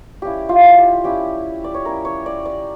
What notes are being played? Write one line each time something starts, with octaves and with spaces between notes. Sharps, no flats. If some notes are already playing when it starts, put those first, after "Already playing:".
G3 C#4 E4 G4
F4
G4
G3 C#4 E4 G4
D5
C#5
G3 C#4 E4 A#4
C#5
D5
D5